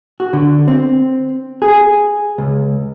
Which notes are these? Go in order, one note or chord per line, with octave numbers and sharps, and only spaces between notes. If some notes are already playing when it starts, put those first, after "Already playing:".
F#4
D3
C4
G#4
C#2